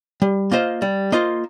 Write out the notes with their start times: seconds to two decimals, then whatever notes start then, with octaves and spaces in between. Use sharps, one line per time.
0.22 G3
0.51 A#3 F4 C5 D#5
0.82 G3
1.12 A#3 F4 C5 D#5